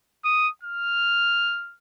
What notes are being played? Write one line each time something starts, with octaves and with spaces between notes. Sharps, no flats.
D#6
F6